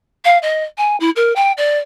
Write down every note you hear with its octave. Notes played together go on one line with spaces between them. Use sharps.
F5
D#5
G#5
E4
A#4
G5
D5